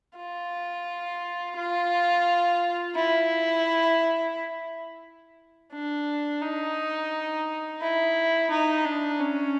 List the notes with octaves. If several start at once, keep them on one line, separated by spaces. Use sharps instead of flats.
F4
F4
E4
D4
D#4
E4
D#4
D4
C#4